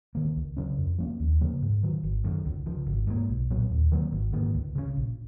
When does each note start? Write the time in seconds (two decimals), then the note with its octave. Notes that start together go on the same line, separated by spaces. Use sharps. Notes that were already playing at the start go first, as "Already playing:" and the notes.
0.15 D#3 A#3
0.36 C#2
0.57 C#3 F#3 C#4
0.78 F2
0.98 F3 A#3 C#4
1.20 D#2
1.41 C#3 F3 A#3
1.62 G#2
1.83 D#3 F#3
2.03 G#1
2.24 F#2 D#3
2.46 C#2
2.66 C#3 F3
2.87 G#1
3.07 G#2 F3 A#3
3.29 B1
3.50 A#2 F#3 B3
3.70 D#2
3.92 D#3 F#3 A#3
4.12 G#1
4.32 G#2 D#3 A#3
4.55 C#2
4.75 C#3 G#3 C#4
4.96 A#1